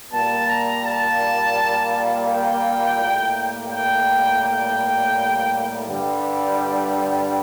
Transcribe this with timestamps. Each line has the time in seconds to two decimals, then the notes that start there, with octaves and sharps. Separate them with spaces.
0.12 A#2 G3 A#3 A5
0.48 A#5
0.84 A5
2.27 G5
2.98 A2 G3 A#3
3.71 G5
4.42 G5
5.85 G2 D3 G3
6.21 D5
6.57 D5